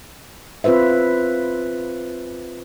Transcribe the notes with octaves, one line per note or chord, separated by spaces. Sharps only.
C4 F4 B4 C5 E5